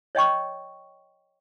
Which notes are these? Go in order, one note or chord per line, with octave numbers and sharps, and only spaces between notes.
C#5 D#5 G5 C#6